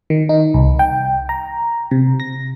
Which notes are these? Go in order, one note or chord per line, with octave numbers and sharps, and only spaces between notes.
D#3
D#4
C2
G5
A#5
C3
A#6